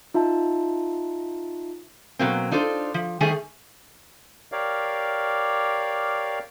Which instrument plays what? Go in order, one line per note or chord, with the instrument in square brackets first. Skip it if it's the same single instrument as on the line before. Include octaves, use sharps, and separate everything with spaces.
[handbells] D#4 F4 E5 A5
[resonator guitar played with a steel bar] B2 F#3 A#3 C4
D4 D#4 F4 A4 B4 C5
F3
D#3 G3 A3 G#4 C5
[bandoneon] G4 A#4 C#5 D5 F5